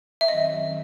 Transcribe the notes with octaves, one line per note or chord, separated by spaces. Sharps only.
E5
F#2 D#3 F#3 C4 D#5